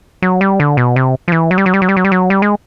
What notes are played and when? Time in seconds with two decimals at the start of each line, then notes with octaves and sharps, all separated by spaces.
0.22 F#3
0.41 G3
0.60 D3
0.77 B2
0.96 C3
1.28 F3
1.32 E3
1.51 F#3
1.58 G3
1.66 F#3
1.74 G3
1.82 F#3
1.89 G3
1.97 F#3
2.04 G3
2.12 F#3
2.30 G3
2.42 G#3